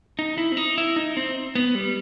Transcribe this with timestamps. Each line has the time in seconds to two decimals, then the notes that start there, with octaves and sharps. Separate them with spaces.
0.19 D#4
0.38 E4
0.52 C4
0.57 D#4
0.78 E4
0.96 D#4
1.17 C4
1.55 B3
1.75 G3